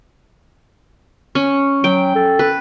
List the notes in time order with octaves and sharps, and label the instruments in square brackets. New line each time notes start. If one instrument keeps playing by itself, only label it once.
[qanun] C#4
[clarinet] F#3 [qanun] G5
[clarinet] A4
[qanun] B4